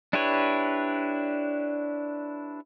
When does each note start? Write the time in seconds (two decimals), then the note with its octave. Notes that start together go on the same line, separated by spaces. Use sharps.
0.13 D4 E4 G4 B4 C#5